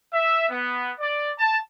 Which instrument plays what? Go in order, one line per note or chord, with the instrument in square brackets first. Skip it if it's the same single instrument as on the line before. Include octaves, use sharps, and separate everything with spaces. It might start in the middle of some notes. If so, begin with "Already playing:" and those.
[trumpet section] E5
B3
D5
A5